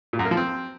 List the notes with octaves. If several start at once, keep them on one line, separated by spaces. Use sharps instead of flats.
A#2
F#2
A#3
F3
C4